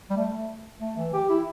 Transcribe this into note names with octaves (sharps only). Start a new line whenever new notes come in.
G3
A3
A3
E3
G4
E4